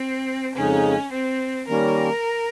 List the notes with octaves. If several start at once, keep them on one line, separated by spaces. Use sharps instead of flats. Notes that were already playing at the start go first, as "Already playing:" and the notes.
Already playing: C4
F2 C#3 G#3 C#4 D#4
C4
D#3 G3 A#3 C#4 A#4